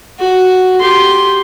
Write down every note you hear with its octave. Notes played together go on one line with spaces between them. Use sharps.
F#4
G4 C6